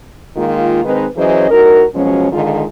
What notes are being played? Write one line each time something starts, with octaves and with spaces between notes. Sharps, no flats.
D#3 G#3 A#3 F4
D#3 G#3 C4 D#4 B4
E3 F#3 C#4 G#4 C5 D#5
A2 D#4 F#4 A#4
B2 F3 F#3 G#3 C#4
D3 D#3 G#3 F4